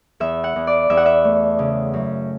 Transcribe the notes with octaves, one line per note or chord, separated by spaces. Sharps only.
E2 E5
F#5
E2
D5
E2 E5
F#5
E5
A3
C#3
F#2